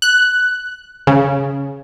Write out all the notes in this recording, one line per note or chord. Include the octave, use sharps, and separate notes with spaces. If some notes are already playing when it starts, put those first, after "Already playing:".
F#6
C#3